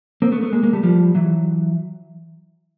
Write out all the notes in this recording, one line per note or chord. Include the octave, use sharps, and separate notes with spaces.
A#3 C4
A3 B3
A3 B3
G#3 A#3
G#3 A#3
G3 A3
F3 G3
E3 F#3